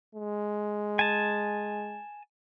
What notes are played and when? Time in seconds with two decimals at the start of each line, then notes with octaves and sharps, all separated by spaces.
0.15 G#3
0.99 G#5 A5